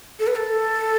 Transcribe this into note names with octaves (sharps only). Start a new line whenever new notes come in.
A4
B4
A4